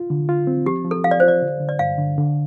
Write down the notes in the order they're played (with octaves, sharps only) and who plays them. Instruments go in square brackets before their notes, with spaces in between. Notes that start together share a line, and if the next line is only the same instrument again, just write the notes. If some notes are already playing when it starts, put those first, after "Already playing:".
Already playing: [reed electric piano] F4
D3
F4
C4
[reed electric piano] F3 [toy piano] G4
[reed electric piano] F3
[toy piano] A4
[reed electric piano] F3 [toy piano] F5
[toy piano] D5
[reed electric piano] F4 [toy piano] C5
[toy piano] D5
[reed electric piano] D3
D3
[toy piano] D5
[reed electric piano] G2 [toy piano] F5
[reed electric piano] D3
D3